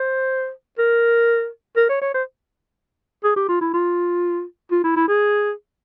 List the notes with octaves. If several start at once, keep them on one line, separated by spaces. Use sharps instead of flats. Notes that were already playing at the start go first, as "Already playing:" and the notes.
Already playing: C5
A#4
A#4
C#5
C#5
C5
G#4
G4
F4
E4
F4
F4
E4
E4
G#4